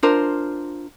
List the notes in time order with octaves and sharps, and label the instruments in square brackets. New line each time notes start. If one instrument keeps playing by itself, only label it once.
[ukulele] D4 F4 A#4 C5